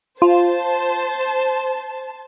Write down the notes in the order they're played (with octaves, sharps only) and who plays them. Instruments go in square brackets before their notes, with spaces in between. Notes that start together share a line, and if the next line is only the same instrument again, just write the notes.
[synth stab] F4 [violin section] C5 A5